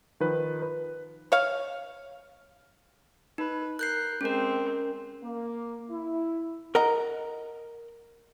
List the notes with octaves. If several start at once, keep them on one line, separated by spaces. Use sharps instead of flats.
D#3 F3 B4
B4
C#5 F5
D#4 B4
A#4 F#6 G6 C7
G#3 C4 C#4 A#4
A#3
E4
A#4 D#5 F#5 A#5